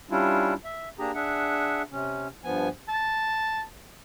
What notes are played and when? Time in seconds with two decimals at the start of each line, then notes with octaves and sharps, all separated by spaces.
0.10 G3 C#4 D4 E4 F4
0.65 E5
0.99 A#3 D4 G4 G#4 A#5
1.15 D4 G#4 E5 F#5
1.91 C3 C#4
2.44 G2 F3 B3 G#5
2.88 A5